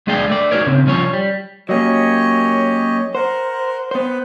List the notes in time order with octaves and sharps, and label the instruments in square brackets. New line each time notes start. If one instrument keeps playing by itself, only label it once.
[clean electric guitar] D2 G#3 G#4 D5 F5 G5
A3 D5
D#4 F#4 G#4 A#4 C#5 D5
C#3 C4
C2 F3 C#4 F4 C#5
G3
[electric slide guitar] F#3 A#3 C#4 [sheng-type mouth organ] G4 C#5 D#5
[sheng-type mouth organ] A#4 F#5 [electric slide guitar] C5
[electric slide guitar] B3 C5 [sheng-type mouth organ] B4 F#5